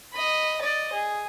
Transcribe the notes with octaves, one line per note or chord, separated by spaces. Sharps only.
D#5 B5
D5 D#5
G#4